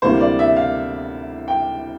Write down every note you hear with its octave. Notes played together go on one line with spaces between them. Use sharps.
D2 C3 E3 G3 A#3 C5
D5
E5
F5
G5